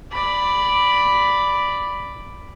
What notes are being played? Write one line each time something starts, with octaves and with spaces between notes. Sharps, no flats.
D5 B5